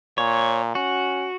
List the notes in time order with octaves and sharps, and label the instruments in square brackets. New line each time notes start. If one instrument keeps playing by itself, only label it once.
[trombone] A#2 [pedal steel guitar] C#5
[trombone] C#4 [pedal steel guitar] F#4